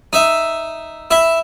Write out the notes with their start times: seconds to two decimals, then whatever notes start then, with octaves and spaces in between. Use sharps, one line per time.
0.13 D#4 E5
1.11 E4 E5